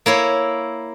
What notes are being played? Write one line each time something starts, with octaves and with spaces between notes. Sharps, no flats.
A#3 E4 C#5